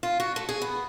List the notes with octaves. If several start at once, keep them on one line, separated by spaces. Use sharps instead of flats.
F4
F#4
A3
G#4
B3